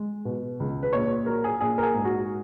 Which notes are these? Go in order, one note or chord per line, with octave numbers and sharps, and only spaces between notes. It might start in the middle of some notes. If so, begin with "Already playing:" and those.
Already playing: G#3
B2
C#2
B4
A#1 C#5
F#3 A#4
G#4
A#1 G#4
A#4
G#4
G#2
F#4